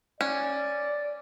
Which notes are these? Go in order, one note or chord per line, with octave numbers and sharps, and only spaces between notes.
C#4 D5